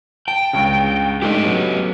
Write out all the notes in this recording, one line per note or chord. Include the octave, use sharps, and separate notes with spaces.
G5 A5
C#2 G2 C#3
G#2 A3 D4 G4 A4 D#5
F#3 B3 C#4